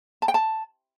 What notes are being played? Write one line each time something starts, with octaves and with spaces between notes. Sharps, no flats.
A5
G5
A5